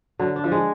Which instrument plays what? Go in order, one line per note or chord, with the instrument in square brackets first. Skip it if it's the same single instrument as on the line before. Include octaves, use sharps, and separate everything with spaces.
[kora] D3 [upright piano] F#3
[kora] D4
[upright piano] F3
[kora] G#3